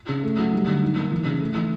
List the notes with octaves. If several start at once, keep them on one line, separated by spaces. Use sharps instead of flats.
C#3
A3
F#3
G3
D3
D#4
A#3
E3
C#3
A3
E3